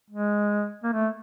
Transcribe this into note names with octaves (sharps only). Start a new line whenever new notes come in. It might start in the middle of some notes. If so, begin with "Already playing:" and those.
G#3
A#3
A3